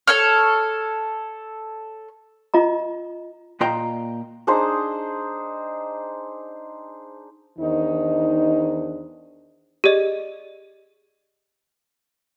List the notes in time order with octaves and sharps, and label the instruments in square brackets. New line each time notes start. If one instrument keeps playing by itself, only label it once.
[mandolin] A4 C#5 F6
[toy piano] F4 D#5 A#5
[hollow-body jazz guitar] A#2 F4 D#5 G5 A#5 C6
[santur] D4 D#4 G#4 C5
[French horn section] E2 D#3 D4 D#4 C5
[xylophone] G4 G#4 D5 D#5